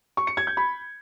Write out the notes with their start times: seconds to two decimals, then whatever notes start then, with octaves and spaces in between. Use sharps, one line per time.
0.17 C#6
0.27 C#7
0.37 G#6
0.47 G6
0.57 B5